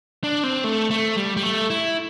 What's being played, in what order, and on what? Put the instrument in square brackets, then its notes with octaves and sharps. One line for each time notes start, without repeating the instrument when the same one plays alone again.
[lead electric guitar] D4
C4
A3
A3
G3
G3
A3
E4